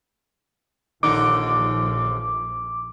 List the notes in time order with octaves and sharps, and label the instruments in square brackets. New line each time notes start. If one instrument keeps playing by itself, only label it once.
[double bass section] A#1 F3 [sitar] D#2 D3 D#4 [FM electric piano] D6